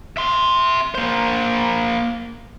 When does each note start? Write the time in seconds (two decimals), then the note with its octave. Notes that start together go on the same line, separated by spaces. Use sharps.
0.17 E5 C6
0.95 A#3 C5